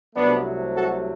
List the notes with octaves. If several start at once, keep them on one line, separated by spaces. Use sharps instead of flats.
C2 C3 F#3 A3 B3 D4
F#4 A4